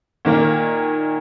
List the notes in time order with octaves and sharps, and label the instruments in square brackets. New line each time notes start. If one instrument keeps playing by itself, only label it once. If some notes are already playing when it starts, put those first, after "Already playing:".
[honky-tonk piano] A#2 D#3 A#3